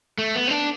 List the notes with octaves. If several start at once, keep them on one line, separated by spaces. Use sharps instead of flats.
A3
B3
C4
D4